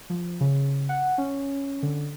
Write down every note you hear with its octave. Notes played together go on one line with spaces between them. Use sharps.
F3
C#3
F#5
C#4
D3